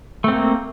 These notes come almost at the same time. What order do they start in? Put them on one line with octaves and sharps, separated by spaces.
A3 C4 A#3